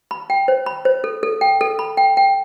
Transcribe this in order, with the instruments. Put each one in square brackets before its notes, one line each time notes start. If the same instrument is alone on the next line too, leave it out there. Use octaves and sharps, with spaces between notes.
[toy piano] B5
G5
C5
B5
C5
A4
A4
G5
A4
B5
G5
G5